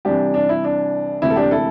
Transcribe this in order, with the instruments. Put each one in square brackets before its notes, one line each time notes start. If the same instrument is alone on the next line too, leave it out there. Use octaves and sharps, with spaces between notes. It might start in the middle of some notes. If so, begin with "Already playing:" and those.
[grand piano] C2 C3 E3 D4 G4
D4
E4
D4
E1 D2 C3 E4
A4
D4 G4
E4 A4